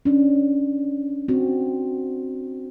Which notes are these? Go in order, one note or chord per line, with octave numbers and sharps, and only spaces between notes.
C#4 D4
C4 F#4